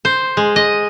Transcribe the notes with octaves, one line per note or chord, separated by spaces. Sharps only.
C5
G#3
D#5